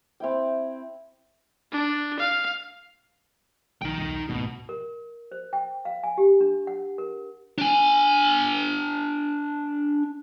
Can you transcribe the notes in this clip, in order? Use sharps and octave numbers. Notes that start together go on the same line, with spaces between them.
C4 E4 G5
D4
F5
B1 D#4 G5
B1 E2
G#1 D2 B2
A#4
C5
G5
F5
G#5
G4
D4
F#5
A#4
D4 G#5